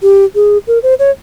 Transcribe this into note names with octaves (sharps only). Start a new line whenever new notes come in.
G4
G#4
A#4
C5
C#5